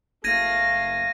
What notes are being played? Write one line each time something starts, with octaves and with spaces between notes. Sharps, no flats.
F#1 A3 F5 G#6 A#6 D#7